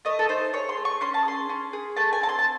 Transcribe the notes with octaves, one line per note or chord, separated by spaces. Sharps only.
A3 D#5
A4
D#4 C5
G#4 C#5
C6
A3
C#6
C#4 C6
A5
G#4 C6
C#4
G#4
A3 A5
G#5
C4 A5
C6
A5